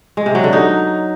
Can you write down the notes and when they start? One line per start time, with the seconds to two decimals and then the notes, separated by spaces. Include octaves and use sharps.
0.17 G#3
0.26 C3
0.35 F#3
0.44 D3
0.53 D#4